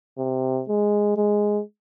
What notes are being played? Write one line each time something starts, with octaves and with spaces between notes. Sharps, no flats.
C3
G#3
G#3